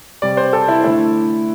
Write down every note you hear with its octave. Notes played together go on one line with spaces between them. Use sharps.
C3 G3 D5
C5
A4
E4
D3 A3 E4